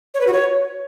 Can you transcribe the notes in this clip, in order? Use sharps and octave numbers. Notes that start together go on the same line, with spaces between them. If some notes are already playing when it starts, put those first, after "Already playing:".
C#5
B4
F#4
C#5